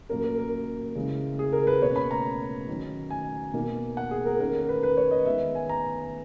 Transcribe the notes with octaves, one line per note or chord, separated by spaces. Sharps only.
A#2 F#3 A#3 C#4 A#4
A#4
A#4
C#3 E3 G#3
G#4
A#4
B4
B2 A#3 C#4 C#5
B5
A#5
D#3 F#3 C#4
G#5
B2 A#3 D#4
F#5
G#4
A#4
D#3 A#3 C#4 A#4
A#4
B4
B4
C#5
D#5
D#3 G#3 B3 E5
G#5
A#5